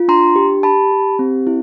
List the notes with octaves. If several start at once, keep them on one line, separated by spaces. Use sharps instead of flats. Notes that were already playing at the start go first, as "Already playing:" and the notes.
Already playing: F4
D4 A#5 C6
G4
G4 A5 B5
G4
C4
E4